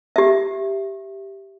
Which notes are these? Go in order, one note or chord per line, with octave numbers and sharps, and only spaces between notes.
G4 E5